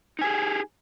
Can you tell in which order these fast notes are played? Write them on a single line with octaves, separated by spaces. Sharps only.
D#4 G#5 G4 G#4